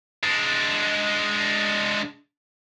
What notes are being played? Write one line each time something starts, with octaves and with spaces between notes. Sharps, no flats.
G#3 D4